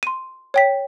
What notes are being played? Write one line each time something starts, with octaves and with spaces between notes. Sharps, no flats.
C6 D#7
C#5 G5 B6